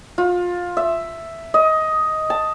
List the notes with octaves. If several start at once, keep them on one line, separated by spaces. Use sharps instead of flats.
F4
E5
D#5
A5